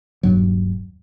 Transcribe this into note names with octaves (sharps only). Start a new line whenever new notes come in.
D#1 G2 F#3